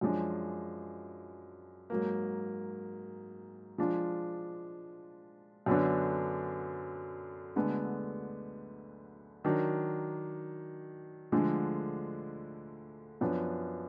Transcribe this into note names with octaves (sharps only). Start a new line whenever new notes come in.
F#2 F3 G#3 D4
G#2 F#3 A#3
F3 G#3 D4 F4
F#2 D3 F#3 B3 D4
D2 D3 G#3 B3 D4
D#3 F#3 D4
D2 D3 F3 G#3 D4
F#2 F3 B3 D4